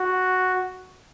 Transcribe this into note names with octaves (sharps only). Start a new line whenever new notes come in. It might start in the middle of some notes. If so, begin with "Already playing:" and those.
Already playing: F#4